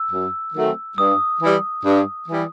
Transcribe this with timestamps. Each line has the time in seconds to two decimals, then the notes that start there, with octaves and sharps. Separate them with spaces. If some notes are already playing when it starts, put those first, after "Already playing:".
Already playing: E6
0.11 F#2
0.55 D#3 F#3 A3 C4
0.98 G2 D#6
1.42 E3 G3
1.85 G2
2.29 E3 G3